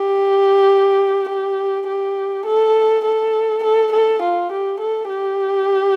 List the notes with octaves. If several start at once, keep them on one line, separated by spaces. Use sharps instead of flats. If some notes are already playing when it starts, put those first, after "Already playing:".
Already playing: G4
G4
G4
A4
A4
A4
A4
F4
G4
A4
G4